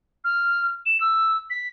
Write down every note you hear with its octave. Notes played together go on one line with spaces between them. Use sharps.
F6
E7
E6
B6